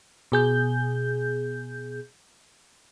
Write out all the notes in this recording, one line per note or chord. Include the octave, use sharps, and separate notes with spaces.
B2 G#4 G6